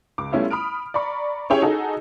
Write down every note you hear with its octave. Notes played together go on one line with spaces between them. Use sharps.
C#2 D6
G3 A3 B3 C#4 E4 F4
B5 D#6 F6 D7
D5 A#5 B5 C#6
C#4 E4 G4 G#4 C#5 G5
D#4 F#4 G#4 A4